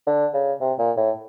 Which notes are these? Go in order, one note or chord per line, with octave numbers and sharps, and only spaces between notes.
D3
C#3
C3
A#2
A2